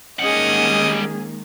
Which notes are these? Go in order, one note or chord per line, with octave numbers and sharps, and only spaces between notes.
D#3 G3 G#3 A#3 C#4 G#4 D#5 F#5